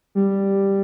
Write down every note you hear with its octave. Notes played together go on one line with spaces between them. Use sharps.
G3